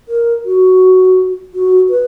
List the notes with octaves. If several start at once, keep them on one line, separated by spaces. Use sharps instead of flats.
A#4
F#4
F#4
B4